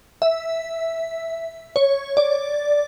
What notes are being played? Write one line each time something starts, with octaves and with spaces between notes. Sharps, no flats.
E5
C#5
D5